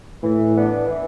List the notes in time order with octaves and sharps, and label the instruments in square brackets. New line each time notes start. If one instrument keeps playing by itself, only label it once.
[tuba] A2 [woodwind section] E3
[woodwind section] B3 D4
E3